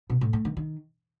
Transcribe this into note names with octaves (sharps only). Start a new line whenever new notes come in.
B2
A2
A3
D#3
D#3